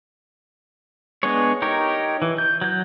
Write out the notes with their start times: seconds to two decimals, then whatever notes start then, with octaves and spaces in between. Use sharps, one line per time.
1.23 G#3 B3 D4 G#4 C#5
1.62 D#4 G4 A#4 C#5
2.22 E3
2.38 G6
2.61 F#3 G6